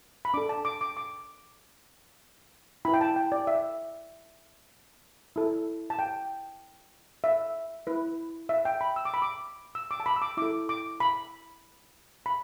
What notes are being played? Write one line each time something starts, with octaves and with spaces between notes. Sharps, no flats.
B5
D4 A4 D6
A5
D6
D6
D6
E4 B4 B5
G5
A5
G5
D5
E5
E4 A4
A5
G5
E5
E4 B4
E5
G5
B5
E6
D6
B5
D6
E6
D6
A5
B5
E6
D6
E4 A4 D6
D6
B5
B5